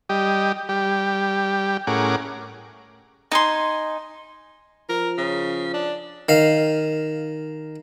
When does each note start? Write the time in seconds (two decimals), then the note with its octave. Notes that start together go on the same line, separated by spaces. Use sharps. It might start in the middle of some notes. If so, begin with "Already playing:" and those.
0.09 G3 G4 D#5
0.69 G3 G4
1.87 A2 C#4 G#4 A#4 F#5 D6
3.32 D#4 G#5 C6
4.89 F3 A#4
5.18 C#3
5.74 D4
6.29 D#3 F5